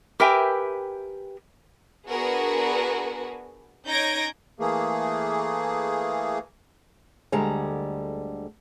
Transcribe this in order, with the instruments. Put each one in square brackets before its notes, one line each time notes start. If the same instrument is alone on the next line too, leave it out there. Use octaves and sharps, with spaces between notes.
[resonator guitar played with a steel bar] G4 A#4 B4 E5 G5 G#5
[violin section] B3 D4 F#4 G#4 A#4 B4
C#4 D#4 G6 G#6 A#6 D7
[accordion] E3 A3 A#3 G#4
[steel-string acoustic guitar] D2 D3 G3 G#3 A#5